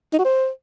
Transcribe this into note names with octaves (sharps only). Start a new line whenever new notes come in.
D#4
F#4
C5